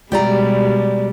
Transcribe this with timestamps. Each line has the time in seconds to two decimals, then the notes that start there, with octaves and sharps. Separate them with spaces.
0.12 B2 G3 G#3 G4 D5 A#5